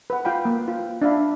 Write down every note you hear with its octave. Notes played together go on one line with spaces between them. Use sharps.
B4 F#5
F4 F5 G5 B5
A#3
F4
D4 E5 F5 B5